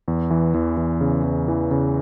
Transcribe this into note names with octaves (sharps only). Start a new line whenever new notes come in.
E2
E3
E2
E3
C#3
E2
E3
C#3